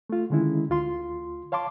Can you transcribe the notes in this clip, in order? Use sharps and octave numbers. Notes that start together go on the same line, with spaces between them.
A3 F4
D3 D#3 G#3 C#4 E4
D2 F4 C6
C#5 F5 A5 C6 D6